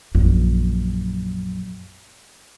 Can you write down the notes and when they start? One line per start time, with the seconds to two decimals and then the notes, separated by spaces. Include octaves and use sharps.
0.15 A#1 F#2